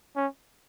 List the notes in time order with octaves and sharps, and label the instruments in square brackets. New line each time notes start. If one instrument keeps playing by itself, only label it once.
[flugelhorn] C#4